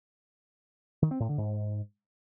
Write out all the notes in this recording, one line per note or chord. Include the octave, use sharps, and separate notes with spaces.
D#3
C4
A2
D3
G#2